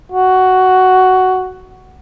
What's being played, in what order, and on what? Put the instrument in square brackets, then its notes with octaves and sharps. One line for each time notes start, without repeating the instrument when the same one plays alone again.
[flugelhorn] F#4